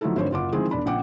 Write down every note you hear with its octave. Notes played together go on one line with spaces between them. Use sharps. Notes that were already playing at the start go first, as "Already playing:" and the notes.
F3 F#3 A3 D#4 E4 A4
G#1 D3 C5 C#5
F#1 F4 F#5 D6
D#3 F3 G#3 C4 E4 G#4
E1 D4 B5
A#1 C#3 F#5 G5 D6